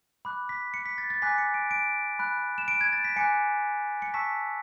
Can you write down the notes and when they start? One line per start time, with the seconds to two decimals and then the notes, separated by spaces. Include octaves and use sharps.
0.25 B5 D6 F#6
0.49 B6
0.74 C#7
0.86 B6
0.98 A6
1.10 A6
1.22 G#5 D6 F#6 B6
1.38 C#7
1.54 D7
1.71 D7
2.19 B5 F#6
2.58 E7
2.68 D7
2.81 G#6
2.93 A6
3.04 B6
3.16 G#5 D6 F#6 C#7
4.02 C#7
4.14 A5 C#6 E6 B6